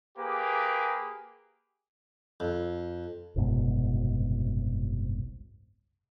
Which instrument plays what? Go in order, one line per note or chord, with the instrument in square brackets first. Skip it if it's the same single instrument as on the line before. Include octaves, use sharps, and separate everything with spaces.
[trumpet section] A#3 G4 G#4 B4
[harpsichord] F2
[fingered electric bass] F#1 C2 G#2 B2